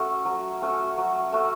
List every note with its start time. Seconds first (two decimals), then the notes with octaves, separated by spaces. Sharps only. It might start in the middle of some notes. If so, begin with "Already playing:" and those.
Already playing: A3 C#4 F#4
0.25 F#3
0.62 A3 C#4 F#4
0.97 F#3
1.32 A3 C#4 F#4